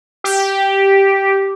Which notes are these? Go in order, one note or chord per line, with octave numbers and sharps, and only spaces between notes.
G4